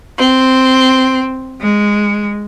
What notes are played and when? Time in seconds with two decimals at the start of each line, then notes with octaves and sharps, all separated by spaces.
0.17 C4
1.61 G#3